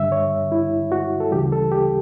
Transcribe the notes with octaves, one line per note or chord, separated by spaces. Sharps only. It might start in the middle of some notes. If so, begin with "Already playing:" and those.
Already playing: G2 D3 G3 E5
C#5
E4
F#4
A4
D2 C#3 E3 G3 G4
A4
G4